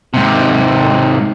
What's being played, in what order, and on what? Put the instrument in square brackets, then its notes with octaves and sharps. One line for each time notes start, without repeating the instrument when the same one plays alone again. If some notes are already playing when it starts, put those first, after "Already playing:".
[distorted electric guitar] G#2 C3